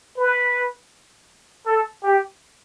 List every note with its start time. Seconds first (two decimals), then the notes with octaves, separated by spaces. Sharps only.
0.17 B4
1.66 A4
2.03 G4